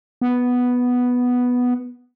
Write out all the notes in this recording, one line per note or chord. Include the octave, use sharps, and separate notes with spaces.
B3